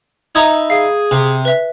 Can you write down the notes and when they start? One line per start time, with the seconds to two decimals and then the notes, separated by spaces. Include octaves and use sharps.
0.35 D#4 E5 A#5 B5 D#6 G#6
0.70 G#4 F5
1.11 C3
1.45 B4 E5